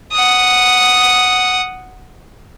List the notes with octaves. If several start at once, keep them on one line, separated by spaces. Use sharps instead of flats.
F#5 D#6